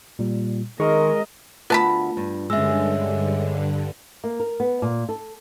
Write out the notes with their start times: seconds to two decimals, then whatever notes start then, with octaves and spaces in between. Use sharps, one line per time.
0.19 A#2 G3
0.80 D#3 G#3 A#4 D#5 C#6
1.70 D2 B3 F4 A#4 A5 B5
2.17 G2
2.50 G2 D3 G#3 C#4 E5 E6
4.24 A#3
4.40 A#4
4.60 B3
4.82 A#2
5.09 A4